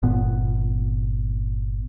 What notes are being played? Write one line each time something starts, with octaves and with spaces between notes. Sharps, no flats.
G1 A#2 B3